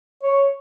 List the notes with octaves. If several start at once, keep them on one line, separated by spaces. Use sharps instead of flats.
C#5